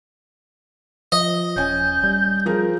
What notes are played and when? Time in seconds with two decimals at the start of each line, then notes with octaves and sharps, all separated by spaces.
1.12 F3 D#5
1.56 D#1 C#4 G#5 G6
2.03 G3
2.46 F3 G#4 A#4